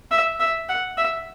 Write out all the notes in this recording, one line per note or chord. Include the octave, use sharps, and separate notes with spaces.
E5
E5
F#5
E5